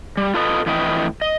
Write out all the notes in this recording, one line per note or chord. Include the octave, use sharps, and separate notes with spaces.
G3
F4 A4 B4 D#5
F2 A2 E3 B4 D#5 G5
D#5